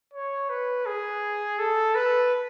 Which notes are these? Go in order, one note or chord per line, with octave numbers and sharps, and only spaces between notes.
C#5
B4
G#4
A4
B4